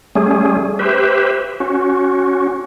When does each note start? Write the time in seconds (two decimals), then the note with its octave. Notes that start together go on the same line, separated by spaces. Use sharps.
0.15 G3 A3 C#4 G#4
0.79 G4 B4 C5 E5
1.60 C#4 F#4